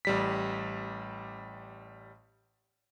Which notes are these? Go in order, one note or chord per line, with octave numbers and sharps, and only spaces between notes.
A1 G3 B6